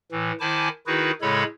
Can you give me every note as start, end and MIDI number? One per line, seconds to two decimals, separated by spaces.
0.12 0.32 45
0.12 0.32 52
0.40 0.69 51
0.40 0.69 64
0.40 0.69 72
0.40 0.69 80
0.40 0.69 81
0.40 0.69 86
0.87 1.11 51
0.87 1.11 63
0.87 1.11 64
0.87 1.11 66
0.87 1.11 68
0.87 1.11 71
1.22 1.44 45
1.22 1.44 49
1.22 1.44 56
1.22 1.44 69
1.22 1.44 73
1.22 1.44 83